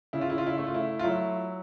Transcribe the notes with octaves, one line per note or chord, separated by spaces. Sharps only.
C#3 E4
F4
E4
F4
E4
A3 E4
F4
E4
F4
F#3 E4